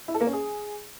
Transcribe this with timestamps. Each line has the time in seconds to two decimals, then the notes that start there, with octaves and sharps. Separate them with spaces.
0.08 E4
0.14 A4
0.21 A#3
0.27 C#4
0.33 G#4